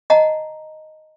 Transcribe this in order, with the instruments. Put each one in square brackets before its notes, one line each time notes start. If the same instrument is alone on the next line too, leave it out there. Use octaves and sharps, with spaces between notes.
[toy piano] D#5 F#5 A5 A#5